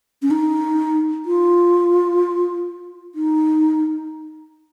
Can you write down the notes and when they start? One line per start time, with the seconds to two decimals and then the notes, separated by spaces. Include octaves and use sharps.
0.22 C#4
0.31 D#4
1.26 F4
3.15 D#4